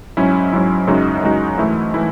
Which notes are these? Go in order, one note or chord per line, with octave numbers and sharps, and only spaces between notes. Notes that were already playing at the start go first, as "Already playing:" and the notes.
G#2 F#3 C#4 E4
G#2 F#3 C#4 E4
F#2 C#3 G#3 D#4 F#4
F#2 C#3 G#3 D#4 F#4
G#2 E3 A3 E4
E3 A3 E4